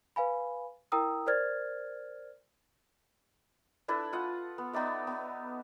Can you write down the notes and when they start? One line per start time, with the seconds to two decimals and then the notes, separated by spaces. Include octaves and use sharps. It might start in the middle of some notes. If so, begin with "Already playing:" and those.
0.16 B4 F5 G#5 B5
0.92 E4 A#4 G5 A#5 D#6 E6
1.26 A#4 C5 D5 F6 G#6 A6
3.88 D4 E4 A4 B4
4.13 F4 F#5 D#6
4.58 B3
4.73 B3 D#4 D5 E5
5.07 B3